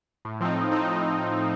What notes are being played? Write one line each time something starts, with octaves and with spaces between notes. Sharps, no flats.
A2
F3 C4 D#4
A2
F3 C4 D#4
A2